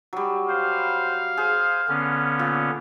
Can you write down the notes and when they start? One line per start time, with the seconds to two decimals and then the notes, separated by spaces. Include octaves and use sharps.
0.13 F#3 G3
0.49 C5 F5
1.38 G#4 C5
1.88 D3 B3 C#4
2.39 A#2